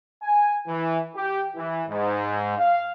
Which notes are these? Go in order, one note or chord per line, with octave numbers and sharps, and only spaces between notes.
G#5
E3
G4
E3
G#2
F5